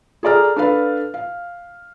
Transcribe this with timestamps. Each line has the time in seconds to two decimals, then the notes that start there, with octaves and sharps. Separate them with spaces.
0.23 G#4 A4 D5 A#5 F6
0.56 D4 A4 B4 F5
1.14 F5